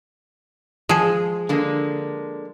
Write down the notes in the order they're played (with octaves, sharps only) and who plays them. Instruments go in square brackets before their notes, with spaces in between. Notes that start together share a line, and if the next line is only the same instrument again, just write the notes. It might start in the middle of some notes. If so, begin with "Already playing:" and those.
[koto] F3 G#4 [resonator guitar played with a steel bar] G#3
[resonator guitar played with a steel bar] D3 G#3 A#3